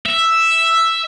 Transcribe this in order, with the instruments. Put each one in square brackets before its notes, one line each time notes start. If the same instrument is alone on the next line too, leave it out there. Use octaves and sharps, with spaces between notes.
[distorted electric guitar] E5